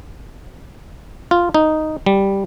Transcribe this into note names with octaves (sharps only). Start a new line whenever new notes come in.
F4
D#4
G3